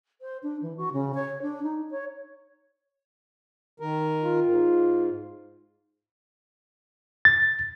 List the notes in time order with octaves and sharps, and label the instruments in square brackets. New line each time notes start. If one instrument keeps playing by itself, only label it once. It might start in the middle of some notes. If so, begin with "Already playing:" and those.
[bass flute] C5
D4
E3
F#4
C#3
C#5
D4
D#4
C#5
[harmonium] D#3 A#4
[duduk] F4
[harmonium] G#2
[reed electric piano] A6